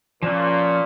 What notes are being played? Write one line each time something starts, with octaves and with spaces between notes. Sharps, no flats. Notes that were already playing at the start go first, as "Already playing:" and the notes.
A#2 F3 C#4